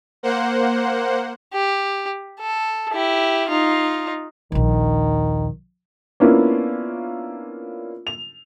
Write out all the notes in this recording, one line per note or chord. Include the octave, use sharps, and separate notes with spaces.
A#3 C5 F#5
G4
A4
E4 G4
D#4 F4
A#1 D#2 D#3
A#3 B3 C#4 D4 E4 F4
F7